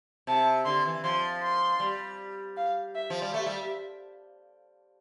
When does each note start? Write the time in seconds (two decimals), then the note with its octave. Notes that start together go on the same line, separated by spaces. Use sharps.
0.27 C3 A5
0.65 D3 C6
0.85 E3
1.04 F3 C6
1.43 C6
1.80 G3
2.57 F5
2.95 E5
3.10 F3
3.22 G3
3.33 A3 E5
3.46 G3